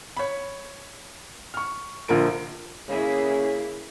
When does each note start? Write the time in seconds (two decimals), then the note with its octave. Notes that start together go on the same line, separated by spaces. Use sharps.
0.17 C#5 B5
1.54 C#6 F6
2.08 A#1 D3 F4 A#4 D7
2.88 C#3 A#3 E4 G#4